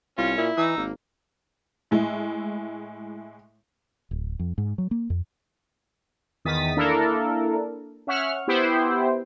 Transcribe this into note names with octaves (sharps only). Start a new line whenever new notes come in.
C2 C#4 F4
A#2 E4
E3 D#4 E6
G#1 A#3
A2 G#3 E4
D1
F2
G#2
F#3
A#3
F2
E2 D#3 D#6 A6 B6
A#3 D4 E4 A4 A#4
C#4 E5 F#5 C#6 F6
B3 E4 G4 C5 G5